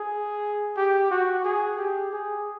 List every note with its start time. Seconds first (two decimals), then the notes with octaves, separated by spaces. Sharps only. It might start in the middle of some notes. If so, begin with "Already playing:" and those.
Already playing: G#4
0.77 G4
1.11 F#4
1.45 G#4
1.78 G4
2.13 G#4